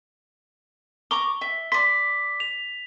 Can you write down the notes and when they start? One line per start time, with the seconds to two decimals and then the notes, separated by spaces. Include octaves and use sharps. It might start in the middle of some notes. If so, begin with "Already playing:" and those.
1.11 A#5 C#6 D6 G7
1.41 E5
1.72 D5 C6 B6
2.40 F7